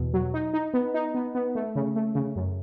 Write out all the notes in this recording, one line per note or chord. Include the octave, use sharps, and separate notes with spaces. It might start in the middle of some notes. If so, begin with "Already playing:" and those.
Already playing: E2 B2
F#3
D#4
D#4
B3
D#4
B3
B3
A3
C#3
A3
C#3
F#2